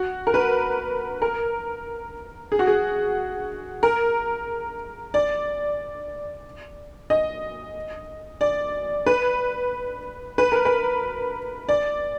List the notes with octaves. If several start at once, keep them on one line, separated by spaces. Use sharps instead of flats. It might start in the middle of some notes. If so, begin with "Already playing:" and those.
Already playing: F#4
A#4
B4
A#4
G#4
F#4
G#4
A#4
D5
D#5
D5
B4
B4
A#4
B4
D5